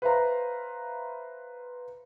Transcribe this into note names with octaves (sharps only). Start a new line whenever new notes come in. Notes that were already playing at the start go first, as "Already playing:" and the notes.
B4 C5 E5 F5 A#5